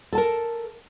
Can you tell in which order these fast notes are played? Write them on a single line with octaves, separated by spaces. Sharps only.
A4 A5 A#4